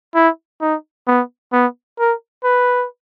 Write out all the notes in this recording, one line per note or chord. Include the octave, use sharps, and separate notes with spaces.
E4
D#4
B3
B3
A#4
B4